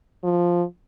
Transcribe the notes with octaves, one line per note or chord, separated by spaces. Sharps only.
F3